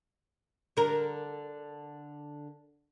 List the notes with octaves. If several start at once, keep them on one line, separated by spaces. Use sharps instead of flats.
D3 A#4